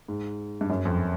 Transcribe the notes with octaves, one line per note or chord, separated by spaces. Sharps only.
G#2
G2
F#2
F2